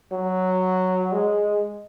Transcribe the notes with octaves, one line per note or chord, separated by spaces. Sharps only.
F#3
G#3